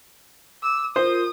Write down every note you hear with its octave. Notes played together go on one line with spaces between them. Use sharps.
D6 E6
F4 A#4 C5 D#6